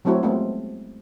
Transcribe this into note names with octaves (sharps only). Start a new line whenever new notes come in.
F#3 A3 C4 E4 F#4 C#5
G#3 A3 B3 C4 F4